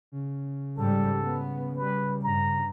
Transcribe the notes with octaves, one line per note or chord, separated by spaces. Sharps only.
C#3
G#2 G3 A4
B3
G3 B4
G2 A#5